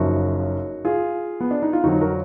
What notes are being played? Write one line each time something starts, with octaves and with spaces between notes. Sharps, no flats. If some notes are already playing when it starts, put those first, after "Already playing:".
Already playing: F#1 F#2 F3 D#4 F#4
F4 G#4
B3
D4
D#4
F4
F2 D3 F#3 D#4 F#4
F#4 A#4